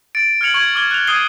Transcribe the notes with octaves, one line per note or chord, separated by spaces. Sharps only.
A6 D7
F6 G#6 C#7 F7 F#7
C#6 G#6
D6 F6 G#6 G7
F#6 F7
D#6 G#6 C7 D#7 G7